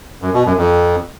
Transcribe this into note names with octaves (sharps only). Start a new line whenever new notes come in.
F#2
B2
F#2
F2